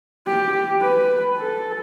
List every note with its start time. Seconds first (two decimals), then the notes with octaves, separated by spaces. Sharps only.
0.27 G4
0.82 B4
1.37 A4